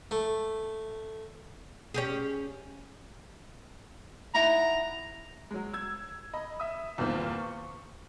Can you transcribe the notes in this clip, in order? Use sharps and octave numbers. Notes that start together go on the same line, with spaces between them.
A3
C#4 G4 G#4
D#4 E4 F#5 A#5
F#3 G#3
E6 G#6
D#5 B5
E5 D#6
E2 G2 A#2 D#3 C4
C#6